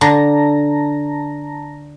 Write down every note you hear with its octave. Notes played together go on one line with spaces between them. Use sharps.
D3 A5 A#5 A#6